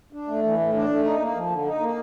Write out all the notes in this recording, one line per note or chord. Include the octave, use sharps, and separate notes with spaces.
D4
A3
E3
A2
D4
A3
D#4
A#3
F3
D3
D#4
A#3